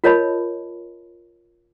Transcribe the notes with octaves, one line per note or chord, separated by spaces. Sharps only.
F4 A#4 C#5 D#5 A5 B5